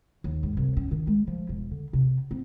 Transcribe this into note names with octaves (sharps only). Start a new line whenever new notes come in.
D#2
G#2
C2
C#4
D#3
G#3
F3
E1
D3
C3
C4